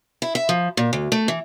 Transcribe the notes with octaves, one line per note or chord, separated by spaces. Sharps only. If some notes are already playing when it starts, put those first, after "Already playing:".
E4
E5
F3
A#2
D2
A3
E3